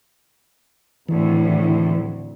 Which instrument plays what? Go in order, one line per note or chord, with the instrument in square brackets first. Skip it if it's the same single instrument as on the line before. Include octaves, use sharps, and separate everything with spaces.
[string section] G#1 D2 A2 [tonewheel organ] E3